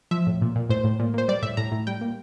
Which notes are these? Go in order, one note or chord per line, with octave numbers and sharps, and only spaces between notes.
F3 E5
A2
A#2
A#2
A2 C5
A2
A#2
A#2 C5
G3 D5
A2 E5
A2 A#5
A2
G3 G5
A#2